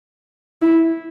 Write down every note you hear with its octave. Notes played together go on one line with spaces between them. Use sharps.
E4